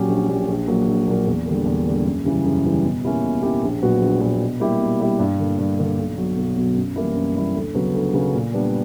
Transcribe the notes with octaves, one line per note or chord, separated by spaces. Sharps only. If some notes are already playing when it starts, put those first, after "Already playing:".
Already playing: A#2 F#3 C#4 G4
A#1
A#2 F#3 C#4 G4
A#1
A#2 F#3 A#3
A#1
A#2 F#3 A#3
E2
D3 G3 A#3
E2
D3 G3 A#3
F#2
C#3 E3 G3
F#2
C#3 E3 G3
B2
A#3 C#4 E4 G4
B2
A#3 C#4 E4 G4
A#1
A#2 F#3 B3 F#4
A#1
A#2 F#3 B3 F#4
B2
G3 A#3 E4 G4
B2
G3 A#3 E4 G4
G2
D3 A#3
G2
D3 A#3
B1
B2 F#3
B1
B2 F#3
F#2
E3 G3 A#3 E4
F#2
E3 G3 A#3 E4
D2
C#3 F#3 B3
D2
C#3 F#3 B3
A#2
G3 B3 D4